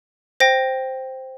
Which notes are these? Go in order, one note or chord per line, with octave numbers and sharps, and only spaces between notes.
C5 G5 A#6